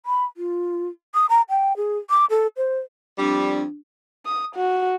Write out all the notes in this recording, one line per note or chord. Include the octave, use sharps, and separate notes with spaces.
B5
F4
D#6
A#5
G5
G#4
D6
A4
C5
F2 G3 D4
D#6
F#4